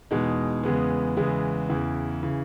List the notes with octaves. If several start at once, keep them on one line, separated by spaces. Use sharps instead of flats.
E2 B2 G#3 D#4
E2 C#3 G#3 B3
E2 C#3 G#3 B3
E2 C#3 E3
C#3 E3